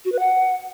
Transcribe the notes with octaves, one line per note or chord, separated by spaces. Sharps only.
F#4
B4
F#5